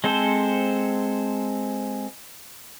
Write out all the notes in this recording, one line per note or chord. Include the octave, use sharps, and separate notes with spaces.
G#3 C4 A4 C5